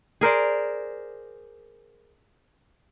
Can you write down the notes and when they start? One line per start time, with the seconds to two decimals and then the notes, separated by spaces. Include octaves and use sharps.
0.21 G#4 A#4 C5 D5